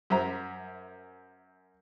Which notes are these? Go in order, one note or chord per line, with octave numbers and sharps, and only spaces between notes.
F#2 C5 E5 A#5